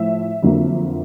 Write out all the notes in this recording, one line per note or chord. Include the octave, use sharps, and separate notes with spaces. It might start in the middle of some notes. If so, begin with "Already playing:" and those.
Already playing: A2 F3 E5
F2 D3 F#3 A#3